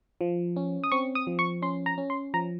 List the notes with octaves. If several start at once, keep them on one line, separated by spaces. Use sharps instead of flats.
F3
C#4
D#6
C4 C#6
D#6
F3
C#6
C#4 C6
A#5
C#4
C6
F3 A#5